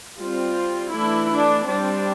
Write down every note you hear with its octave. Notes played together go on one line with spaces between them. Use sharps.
G3 C4 F4
E3 A3 D4 E4
D4
G3 C4 D4